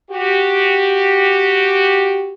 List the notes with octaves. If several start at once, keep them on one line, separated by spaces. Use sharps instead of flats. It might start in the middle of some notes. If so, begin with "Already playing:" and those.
F#4 G4